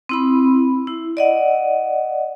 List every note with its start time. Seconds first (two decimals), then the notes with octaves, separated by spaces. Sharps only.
0.09 C4 E4 B5
0.87 E4
1.17 D5 D#5 F#5